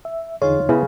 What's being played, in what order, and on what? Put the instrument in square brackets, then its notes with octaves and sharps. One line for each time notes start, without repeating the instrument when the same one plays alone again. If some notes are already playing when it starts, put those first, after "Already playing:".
[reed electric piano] E5
[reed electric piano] E2 D3 D#4 [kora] F4 [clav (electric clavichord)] G#4 [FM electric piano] C#5
[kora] C#3 [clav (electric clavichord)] B3 [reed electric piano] E4